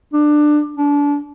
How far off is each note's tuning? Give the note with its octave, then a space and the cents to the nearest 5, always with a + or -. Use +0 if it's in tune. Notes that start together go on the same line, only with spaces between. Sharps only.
D4 +20
D4 -30